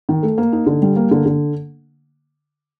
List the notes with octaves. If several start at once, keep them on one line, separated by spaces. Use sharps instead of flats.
D#3
A3
A#3
D#4
D3
G3
A#3
D3
D3